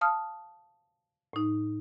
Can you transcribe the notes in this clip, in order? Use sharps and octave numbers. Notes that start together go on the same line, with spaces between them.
F5 A5 D#6 F6
A2 D#4